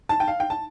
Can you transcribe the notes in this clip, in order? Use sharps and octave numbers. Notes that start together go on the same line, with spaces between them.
A5
G5
F5
G5
A5